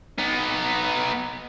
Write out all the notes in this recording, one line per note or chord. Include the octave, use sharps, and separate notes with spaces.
B3 D#4